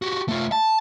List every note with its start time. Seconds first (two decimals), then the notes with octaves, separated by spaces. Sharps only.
0.02 F#4 G4
0.29 A3 F4
0.52 A5